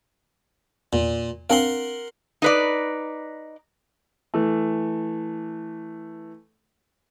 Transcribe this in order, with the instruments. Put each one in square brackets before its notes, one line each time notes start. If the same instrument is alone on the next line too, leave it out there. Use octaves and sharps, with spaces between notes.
[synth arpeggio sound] E2 [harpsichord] A#2
[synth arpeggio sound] C4 D4 F5 [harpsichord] A#4 F#5 C6
[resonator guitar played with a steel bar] D#4 B4 D5
[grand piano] E3 A3